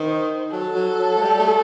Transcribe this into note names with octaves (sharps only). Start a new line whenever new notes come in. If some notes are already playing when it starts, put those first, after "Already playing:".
Already playing: D#3 C5
F#3 A4
F#3
F#3
A3
G3
A3